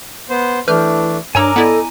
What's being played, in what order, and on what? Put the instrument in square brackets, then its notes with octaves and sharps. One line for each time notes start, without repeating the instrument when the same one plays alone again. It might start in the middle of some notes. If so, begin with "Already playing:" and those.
[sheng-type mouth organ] B3 C5
[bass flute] E3 [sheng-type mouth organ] A3 D4 [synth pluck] B4 F6 G6
[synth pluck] G2 C#5 E6 [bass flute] D4 [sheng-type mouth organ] A#4 [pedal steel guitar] G#5 A#5 D6
[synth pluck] B3 E4 D5 [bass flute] A4 [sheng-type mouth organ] D#5